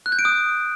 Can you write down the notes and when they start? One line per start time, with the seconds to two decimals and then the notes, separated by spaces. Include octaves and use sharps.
0.06 F#6
0.12 G6
0.19 D7
0.25 D#6